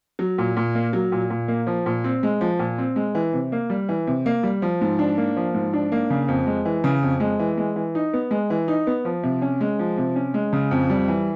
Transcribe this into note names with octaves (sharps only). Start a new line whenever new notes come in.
F#3
A#2
A#2
A#3
F#3
A#2
A#2
A#3
F3
A#2
C4
G#3
F3
A#2
C4
G#3
E3
C3
A#3
G3
E3
C3
A#3
G3
F3
G#2
D4
A#3
F3
G#2
D4
A#3
C#3
F2
G#3
E3
C#3
F2
G#3
E3
G#3
E3
D#4
B3
G#3
E3
D#4
B3
F3
C3
C#4
G#3
F3
C3
C#4
G#3
C#3
F2
G3
E3